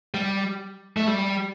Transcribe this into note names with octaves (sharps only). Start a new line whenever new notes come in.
G3
A3
G3